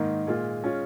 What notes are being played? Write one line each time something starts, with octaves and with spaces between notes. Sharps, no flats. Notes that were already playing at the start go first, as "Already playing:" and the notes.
Already playing: G#2 D#3 A#3 D#4
A#2 G#3 F4
G#3 C#4 F4